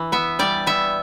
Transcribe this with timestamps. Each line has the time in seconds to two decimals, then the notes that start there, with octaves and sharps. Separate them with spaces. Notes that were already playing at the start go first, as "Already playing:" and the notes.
Already playing: E3
0.12 B3 E5
0.39 G3 D5
0.67 B3 E5